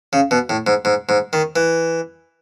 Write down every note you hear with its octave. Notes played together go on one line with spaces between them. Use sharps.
C#3
B2
A2
G#2
G#2
G#2
D#3
E3